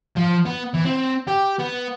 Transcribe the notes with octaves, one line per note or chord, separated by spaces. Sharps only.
F3
B3
E3
C4
G4
B3